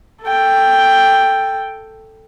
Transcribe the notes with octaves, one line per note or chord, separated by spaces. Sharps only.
A4 G5